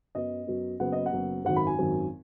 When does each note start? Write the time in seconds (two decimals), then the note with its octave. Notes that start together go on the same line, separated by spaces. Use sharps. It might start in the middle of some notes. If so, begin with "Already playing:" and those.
0.15 F#2 F#3 B3 D#5
0.47 F#2 F#3 B3
0.80 F#1 F#2 F#3 B3 F#5
0.92 D#5
1.06 F#5
1.12 F#1 F#2 F#3 B3
1.45 G#1 F#2 D#3 F#3 F#5
1.56 B5
1.67 G#5
1.79 G#1 F#2 D#3 F#3